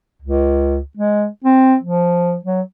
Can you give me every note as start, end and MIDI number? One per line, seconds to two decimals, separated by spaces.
0.22 0.79 37
0.97 1.27 56
1.44 1.76 60
1.83 2.36 53
2.45 2.61 54